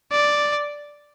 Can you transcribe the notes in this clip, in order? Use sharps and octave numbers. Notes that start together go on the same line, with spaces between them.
D5